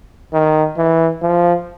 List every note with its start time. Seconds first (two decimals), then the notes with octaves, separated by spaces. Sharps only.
0.33 D#3
0.77 E3
1.22 F3